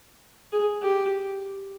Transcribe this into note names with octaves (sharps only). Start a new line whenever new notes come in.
G#4
G4